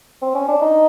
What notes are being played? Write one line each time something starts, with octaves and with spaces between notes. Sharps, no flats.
C4
C#4
D4
D#4